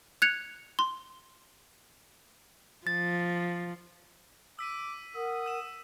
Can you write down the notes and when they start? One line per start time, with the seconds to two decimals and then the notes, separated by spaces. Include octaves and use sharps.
0.22 F#6 G#6 C#7 F7
0.79 C6
2.87 F3 A6
4.59 D6 E6 B6 D#7
5.15 A#4 F#5 D#6
5.46 E6 E7